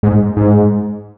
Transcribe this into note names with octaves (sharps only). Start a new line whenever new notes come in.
G#2
G#2